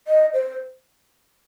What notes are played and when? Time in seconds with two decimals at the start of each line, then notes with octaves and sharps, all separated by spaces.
0.08 D#5
0.34 C5